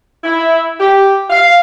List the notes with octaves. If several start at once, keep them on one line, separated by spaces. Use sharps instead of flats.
E4
G4
F5